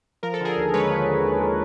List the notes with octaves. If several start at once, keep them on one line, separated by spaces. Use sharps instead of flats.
F3 A#4
A4
D3 G#4 A#4
D#2
G#3 B4 C#5
F3
D3
D#2
G#3